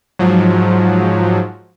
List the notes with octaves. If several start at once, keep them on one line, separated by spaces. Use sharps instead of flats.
G#2 F3 F#3